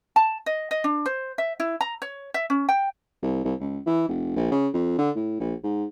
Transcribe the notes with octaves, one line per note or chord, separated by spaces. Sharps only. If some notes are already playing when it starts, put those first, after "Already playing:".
A5
D#5
D#5
D4
C5
E5
E4
A#5
C#5
E5
C#4
G5
C2
C2
C#2
E3
F1
A#1
C#3
F2
D3
A2
A#1
G#2